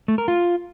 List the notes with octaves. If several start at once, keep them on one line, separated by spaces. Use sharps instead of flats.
A3
A#4
F4